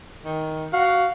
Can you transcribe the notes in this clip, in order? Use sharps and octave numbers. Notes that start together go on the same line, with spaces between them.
D#3
F#4 F5